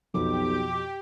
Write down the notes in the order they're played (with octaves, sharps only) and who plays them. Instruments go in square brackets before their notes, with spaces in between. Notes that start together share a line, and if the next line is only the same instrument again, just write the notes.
[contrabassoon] B1 [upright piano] F2 B2 [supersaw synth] G4 [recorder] D6